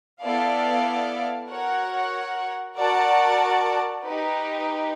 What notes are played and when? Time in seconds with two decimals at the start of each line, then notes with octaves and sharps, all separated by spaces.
0.22 B3 E4 A4 D5 F5
1.48 F#4 A#4 C#5 F#5
2.76 F#4 A#4 D5 F#5 A5
4.03 D#4 G4 B4